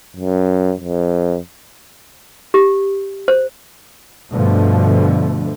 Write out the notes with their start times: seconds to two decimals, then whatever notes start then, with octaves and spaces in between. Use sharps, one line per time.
0.16 F#2
0.81 F2
2.54 G4
3.28 C5
4.32 G2 B2 D3 F3 A3